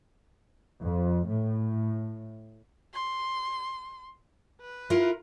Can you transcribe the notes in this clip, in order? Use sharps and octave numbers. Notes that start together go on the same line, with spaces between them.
F2
A2
C6
B4
E4 F4 A#4